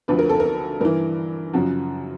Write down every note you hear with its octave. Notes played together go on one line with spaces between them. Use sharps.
D2 D3 F3 B4
A#4
A4
A#4
G2 E3 A#4
F#2 C#3 F3 F#4